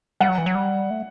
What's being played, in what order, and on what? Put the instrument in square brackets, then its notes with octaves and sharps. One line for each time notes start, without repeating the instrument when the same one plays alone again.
[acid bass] G3 [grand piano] F#5
[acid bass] F#3
E3
F#3
G3
A3